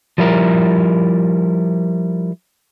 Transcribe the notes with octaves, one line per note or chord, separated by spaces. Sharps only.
F3 G3 E4 A#4